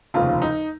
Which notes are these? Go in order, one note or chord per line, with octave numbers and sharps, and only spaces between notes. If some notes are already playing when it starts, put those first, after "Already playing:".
F1 D#2 C#3 F3 F4
D#4